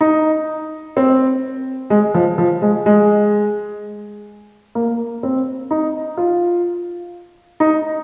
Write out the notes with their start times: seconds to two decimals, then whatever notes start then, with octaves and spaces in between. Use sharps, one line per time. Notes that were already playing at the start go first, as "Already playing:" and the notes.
0.01 D#4
0.97 C4
1.90 G#3
2.14 F3
2.38 F3
2.62 G#3
2.86 G#3
4.75 A#3
5.23 C4
5.71 D#4
6.17 F4
7.60 D#4